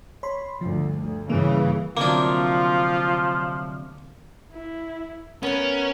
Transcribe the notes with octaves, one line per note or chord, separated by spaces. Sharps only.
C#5 B5 C6
D2 G2 F3
D2
G2 C#3 E3 A#3
D2 C3 F3 F#3 A#3 D4 F4
E4
B3 C#4 A#4 F#5